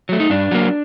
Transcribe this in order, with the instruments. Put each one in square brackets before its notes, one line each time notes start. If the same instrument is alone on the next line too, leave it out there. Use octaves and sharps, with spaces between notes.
[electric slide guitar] F#3 A3
D#4
G2 D4
F#3 A#3